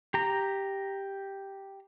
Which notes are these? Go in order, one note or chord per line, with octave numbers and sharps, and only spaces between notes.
G4 A#5